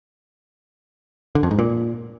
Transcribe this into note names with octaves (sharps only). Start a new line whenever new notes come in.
D3
F2
G#2
A#2